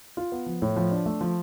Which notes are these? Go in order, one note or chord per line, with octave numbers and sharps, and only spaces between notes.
F4
B3
F3
A2
F3
D4
A3
F3